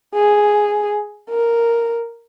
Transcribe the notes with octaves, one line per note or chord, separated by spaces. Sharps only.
G#4
A#4